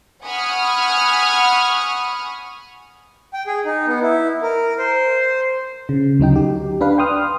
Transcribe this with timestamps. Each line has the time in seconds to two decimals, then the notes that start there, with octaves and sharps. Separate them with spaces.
0.24 F#5 G#5 B5 C#6 D#6 F6
3.34 G5
3.47 G#4
3.65 D#4
3.87 B3
4.02 E4
4.42 A#4
4.79 C5
5.89 C#3
6.19 D2 F#3 D#4 G5
6.36 G4
6.81 D4 B4 F5
6.98 G5 C6 D#6 F6